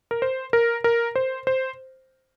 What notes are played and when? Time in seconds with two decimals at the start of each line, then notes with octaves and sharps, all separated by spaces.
0.11 A#4
0.22 C5
0.53 A#4
0.84 A#4
1.16 C5
1.47 C5